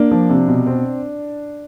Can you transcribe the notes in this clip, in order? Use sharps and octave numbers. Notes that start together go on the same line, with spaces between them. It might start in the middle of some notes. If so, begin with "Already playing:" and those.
Already playing: A#3 D4
F3
C3
B2
C4